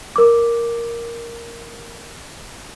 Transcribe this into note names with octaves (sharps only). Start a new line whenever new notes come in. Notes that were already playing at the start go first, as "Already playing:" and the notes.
A#4 D6